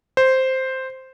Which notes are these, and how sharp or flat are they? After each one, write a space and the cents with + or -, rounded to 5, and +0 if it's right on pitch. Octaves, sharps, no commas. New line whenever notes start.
C5 +0